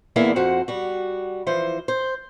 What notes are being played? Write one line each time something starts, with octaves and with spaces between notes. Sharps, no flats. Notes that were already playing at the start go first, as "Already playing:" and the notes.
E2 D3 A#3 B3 E4 G#5
F2 F#4 C5 F#5
G3 F#4
E3 F3 C5
C5